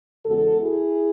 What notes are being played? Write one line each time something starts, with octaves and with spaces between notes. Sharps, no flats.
E2 C#3 G#3 B3 F#4 A4
E4 G#4